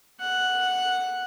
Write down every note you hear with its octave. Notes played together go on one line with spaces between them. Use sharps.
F#5